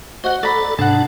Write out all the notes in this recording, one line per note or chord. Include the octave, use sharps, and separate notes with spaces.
F#4 C5 D#5 F#5
A4 D5 A#5 B5
G#2 C3 D4 F#5 A5